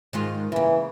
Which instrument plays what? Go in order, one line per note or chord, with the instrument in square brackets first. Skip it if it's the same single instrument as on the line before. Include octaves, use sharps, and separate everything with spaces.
[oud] G#2 D#3 F4
[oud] C#3 A#3 [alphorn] E3